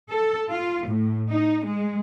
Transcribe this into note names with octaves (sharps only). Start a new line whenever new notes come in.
A4
F4
A2
D#4
G#3